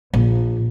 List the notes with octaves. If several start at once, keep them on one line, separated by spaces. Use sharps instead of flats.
A#1